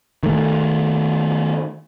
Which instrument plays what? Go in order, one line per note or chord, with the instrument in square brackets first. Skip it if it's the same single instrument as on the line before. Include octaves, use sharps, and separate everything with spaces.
[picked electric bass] D#3 A3